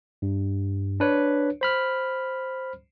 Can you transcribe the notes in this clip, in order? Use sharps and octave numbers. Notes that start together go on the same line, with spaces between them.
G2
D4 B4 C#5
C5 B5 F6